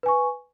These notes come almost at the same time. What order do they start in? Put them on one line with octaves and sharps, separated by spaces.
B4 G#5 C#6